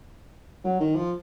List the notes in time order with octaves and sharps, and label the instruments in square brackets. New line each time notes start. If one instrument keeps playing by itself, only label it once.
[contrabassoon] F#3
D#3
F3